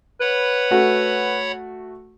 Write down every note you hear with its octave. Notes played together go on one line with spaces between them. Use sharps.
B4 C#5 F#5 B5
A3 F#4